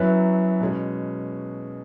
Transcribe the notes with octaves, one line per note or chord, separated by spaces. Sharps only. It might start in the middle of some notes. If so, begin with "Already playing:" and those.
Already playing: F#2 F#3 B3 E4 B4
B2 G#3 C#4